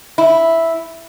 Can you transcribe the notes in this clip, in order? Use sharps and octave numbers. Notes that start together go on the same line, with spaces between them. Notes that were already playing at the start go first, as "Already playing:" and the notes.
E4